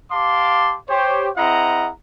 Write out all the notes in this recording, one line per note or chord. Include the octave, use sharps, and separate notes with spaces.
G4 F5 A5 C6 D6
G4 C5 C#5
C4 E4 G#4 D#5 F#5 A#5